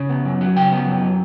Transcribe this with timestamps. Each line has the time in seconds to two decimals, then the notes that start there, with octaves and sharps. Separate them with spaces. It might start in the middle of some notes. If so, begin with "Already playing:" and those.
Already playing: C#3
0.09 B3
0.25 F#2
0.41 F#3
0.56 C#3 G5
0.72 B3
0.87 F#2
1.02 F#3